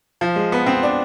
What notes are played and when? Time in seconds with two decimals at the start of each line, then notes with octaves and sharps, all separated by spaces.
0.21 F3
0.36 G#3
0.52 B3
0.66 C4
0.83 D4